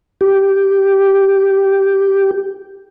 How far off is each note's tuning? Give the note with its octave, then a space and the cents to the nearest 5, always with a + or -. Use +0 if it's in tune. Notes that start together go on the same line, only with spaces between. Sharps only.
G4 -5